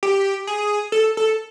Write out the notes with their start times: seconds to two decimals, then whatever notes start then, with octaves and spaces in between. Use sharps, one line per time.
0.03 G4
0.47 G#4
0.92 A4
1.17 A4